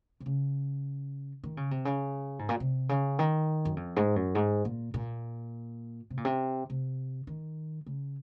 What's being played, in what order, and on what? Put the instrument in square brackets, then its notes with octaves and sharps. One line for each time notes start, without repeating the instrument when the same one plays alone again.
[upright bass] C3
C#3
D#3
C#3
C3
C#3
G#2
A#2
C3
C#3
D#3
F#2
F2
G#2
F#2
G#2
A#2
A#2
C3
A#2
C3
C3
D#3
C#3